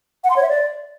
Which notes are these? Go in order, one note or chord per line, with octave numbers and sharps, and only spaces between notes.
F#5
C6
C#5
E5
D5